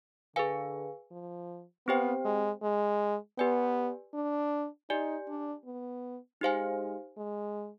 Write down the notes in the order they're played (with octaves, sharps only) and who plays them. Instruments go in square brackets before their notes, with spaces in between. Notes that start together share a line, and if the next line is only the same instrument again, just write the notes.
[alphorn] D3 [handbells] G#4 B4 F5 G#5
[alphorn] F3
[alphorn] B3 [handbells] C4 G4 C5 G5
[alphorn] G#3
G#3
[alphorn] B3 [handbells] G4 B4 D5 G#5
[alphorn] D4
[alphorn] D#4 [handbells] G4 D5 G#5
[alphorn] D4
B3
[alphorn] G#3 [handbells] D#4 G4 C5 F5 G#5
[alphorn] G#3